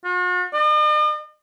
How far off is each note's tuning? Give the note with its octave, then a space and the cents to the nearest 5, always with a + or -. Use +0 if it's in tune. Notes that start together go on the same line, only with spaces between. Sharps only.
F#4 -45
D#5 -45